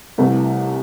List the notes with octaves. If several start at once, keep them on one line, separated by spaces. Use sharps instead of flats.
C2 C3 E3 A3